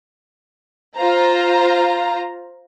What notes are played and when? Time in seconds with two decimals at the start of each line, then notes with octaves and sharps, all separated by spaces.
0.97 F4 C5 A#5